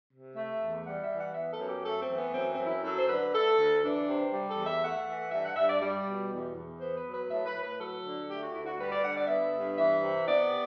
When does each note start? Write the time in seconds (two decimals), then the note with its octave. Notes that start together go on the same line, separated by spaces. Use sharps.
0.10 C3
0.36 A3 E5
0.60 E2
0.85 G3 F#5
1.02 E5
1.11 E3
1.19 F#5
1.34 B3 E5
1.52 A4
1.59 F#2
1.68 G4
1.84 A3 A4
2.01 C4
2.08 E3
2.18 B3
2.34 F#2 C4
2.51 C4
2.59 F#2
2.66 E4
2.83 F#3 A4
2.97 C5
3.08 D3 B4
3.33 A3 A4
3.58 D2
3.83 E3 D4
4.07 C3
4.32 G3
4.49 A4
4.57 E2
4.66 E5
4.81 A3 F#5
5.06 E3
5.32 G2 E5
5.43 F#5
5.56 G2 E5
5.68 D5
5.81 G3
6.05 B2
6.31 E2
6.55 E2
6.80 B3 C5
6.97 B4
7.05 F#3
7.13 B4
7.29 A2 E5
7.46 B4
7.54 A2
7.63 B4
7.79 F#3 A4
8.04 D3
8.28 A3 G4
8.41 F#4
8.53 D2 E4
8.65 F#4
8.78 G3 B4
8.90 D5
9.03 D3 F#5
9.16 D5
9.27 B3 E5
9.52 G2
9.77 E3 E5
10.01 C3
10.26 B3 D5